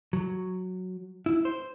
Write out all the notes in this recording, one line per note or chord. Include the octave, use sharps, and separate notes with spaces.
F#3
E4
C5